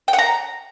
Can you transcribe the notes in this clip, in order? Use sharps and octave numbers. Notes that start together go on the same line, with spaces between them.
G5
F#5
A#5